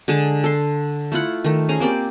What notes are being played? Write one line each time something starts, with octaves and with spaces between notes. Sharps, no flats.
D3 G#3 G#4 A5
A4 C6
A3 E4 F4 F#5
D#3 A3
C#4 G#4 C5 A#5
A#3 C4 G4 D5